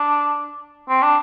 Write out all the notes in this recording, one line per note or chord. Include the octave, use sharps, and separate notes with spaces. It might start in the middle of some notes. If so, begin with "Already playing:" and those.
Already playing: D4
C4
D4